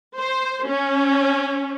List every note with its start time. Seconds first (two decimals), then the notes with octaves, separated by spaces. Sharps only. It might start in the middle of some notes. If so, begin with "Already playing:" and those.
0.18 C5
0.67 C#4